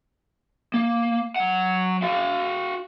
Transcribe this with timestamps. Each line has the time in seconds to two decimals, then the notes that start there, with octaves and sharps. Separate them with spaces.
0.74 A#3
1.36 F#3 F#5
2.02 F#4 F5